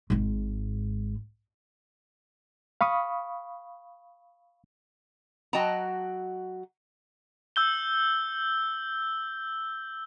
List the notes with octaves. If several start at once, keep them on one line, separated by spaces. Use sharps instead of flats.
G#1 G#2
F5 B5 C#6 D#6
F#3 F#4 D#5 G5 A5 A#5
E6 G6 G7